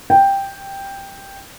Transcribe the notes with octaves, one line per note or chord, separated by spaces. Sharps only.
G5